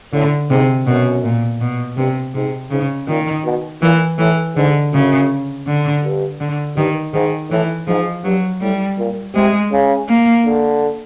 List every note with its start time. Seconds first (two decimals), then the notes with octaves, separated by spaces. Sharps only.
0.13 A2 D3
0.50 G#2 C3
0.87 F#2 B2
1.24 A#2
1.61 B2
1.97 G2 C3
2.34 G#2 C3
2.71 G#2 C#3
3.08 A#2 D#3
3.45 B2
3.82 A#2 E3
4.18 A2 E3
4.56 G#2 D3
4.93 F#2 C#3
5.66 D3
6.04 G2
6.40 D3
6.77 G2 D#3
7.13 G#2 D#3
7.51 A2 E3
7.87 G#2 F3
8.24 G2 F#3
8.61 A2 G3
8.98 A#2
9.34 C3 G#3
9.72 C#3
10.08 A#3
10.45 D3